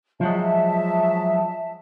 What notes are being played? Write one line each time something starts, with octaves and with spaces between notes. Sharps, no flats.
F3 F#3 G#3 E5 A5